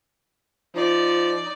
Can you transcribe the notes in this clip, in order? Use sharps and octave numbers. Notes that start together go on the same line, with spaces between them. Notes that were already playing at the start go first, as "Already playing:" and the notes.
F3 D#4 D5